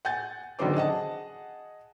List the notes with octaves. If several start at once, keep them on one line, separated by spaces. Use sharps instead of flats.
F#5 G#5 G6 A6
F#2 D3 D#3 F#3 C5 D6
G#4 D#5 F#5 A5